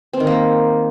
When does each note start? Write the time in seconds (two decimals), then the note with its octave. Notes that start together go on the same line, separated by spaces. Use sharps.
0.13 C4
0.20 D#3
0.27 A#3